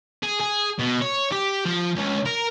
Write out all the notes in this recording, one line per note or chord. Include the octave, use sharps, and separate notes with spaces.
G#4
G#4
B2
C#5
G4
F3
C#2
A#4